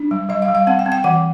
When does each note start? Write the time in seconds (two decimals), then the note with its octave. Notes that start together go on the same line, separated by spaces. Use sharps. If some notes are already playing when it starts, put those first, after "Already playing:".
Already playing: D4
0.11 G3
0.29 G3 D#5
0.42 F5
0.48 G3
0.55 F5
0.67 C4 F#5
0.79 G5
0.86 C4
0.92 G5
1.04 E3 F#5